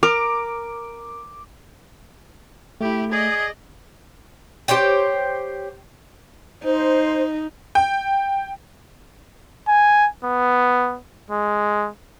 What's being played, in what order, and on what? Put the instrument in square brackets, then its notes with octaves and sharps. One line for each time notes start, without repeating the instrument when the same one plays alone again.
[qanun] A#4 [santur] D6
[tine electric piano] A3 [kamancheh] E4 G4
[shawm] G#4 [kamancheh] D5 D#5
[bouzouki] G4 C5 C#5 G5
[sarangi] D#4 [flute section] C5
[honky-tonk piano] G5
[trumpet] G#5
B3
G#3